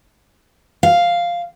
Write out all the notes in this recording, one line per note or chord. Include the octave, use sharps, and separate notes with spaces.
F5